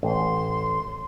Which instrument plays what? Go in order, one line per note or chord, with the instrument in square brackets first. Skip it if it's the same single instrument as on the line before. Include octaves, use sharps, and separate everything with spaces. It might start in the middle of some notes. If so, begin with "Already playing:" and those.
[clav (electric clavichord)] A1 [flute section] C6